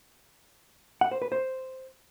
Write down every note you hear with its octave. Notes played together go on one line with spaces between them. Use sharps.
F#5
C5
B4
C5